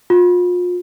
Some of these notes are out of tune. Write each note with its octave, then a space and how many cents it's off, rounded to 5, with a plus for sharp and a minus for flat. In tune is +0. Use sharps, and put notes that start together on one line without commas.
F4 +35